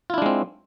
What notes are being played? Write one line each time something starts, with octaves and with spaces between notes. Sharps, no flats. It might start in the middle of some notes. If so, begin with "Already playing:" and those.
G#3 C4 D4 E4 F4